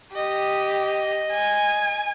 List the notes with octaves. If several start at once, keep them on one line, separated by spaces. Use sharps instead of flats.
G4 D#5
G#5